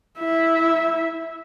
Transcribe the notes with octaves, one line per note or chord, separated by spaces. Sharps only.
E4 E5